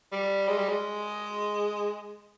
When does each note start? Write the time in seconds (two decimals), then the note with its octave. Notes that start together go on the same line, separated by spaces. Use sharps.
0.12 G3
0.48 G#3
0.58 G3
0.68 G#3